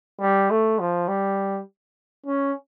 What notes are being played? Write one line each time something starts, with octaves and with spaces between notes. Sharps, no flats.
G3
A3
F3
G3
C#4